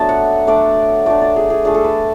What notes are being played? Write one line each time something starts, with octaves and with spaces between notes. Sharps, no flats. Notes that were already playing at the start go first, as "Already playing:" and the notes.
Already playing: F#3 A3 B3 D4 E5 A5
F#5
A3 D4 D5
A3 D4 D5
D5
G#4
G#4
A3 D4 G#4
A4
B4